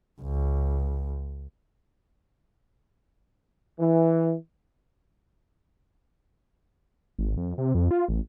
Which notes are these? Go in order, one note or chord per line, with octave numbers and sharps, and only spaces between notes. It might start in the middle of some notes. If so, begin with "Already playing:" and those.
C#2
E3
G#1
F2
C3
F2
F4
A1